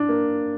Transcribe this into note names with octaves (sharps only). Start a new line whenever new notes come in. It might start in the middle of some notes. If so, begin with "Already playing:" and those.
Already playing: D4
A#3